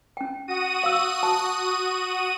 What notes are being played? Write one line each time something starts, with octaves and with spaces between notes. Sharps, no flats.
C#4 G5
F#4 D#6 D#7
F5 E6
A5